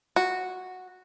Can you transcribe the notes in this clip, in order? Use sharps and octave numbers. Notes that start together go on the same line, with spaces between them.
F#4